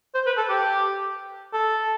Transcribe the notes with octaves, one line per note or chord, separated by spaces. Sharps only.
C5
B4
A4
G4
A4